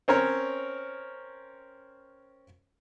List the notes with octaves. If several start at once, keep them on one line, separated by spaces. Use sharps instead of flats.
C4 C#4 A#4 C#5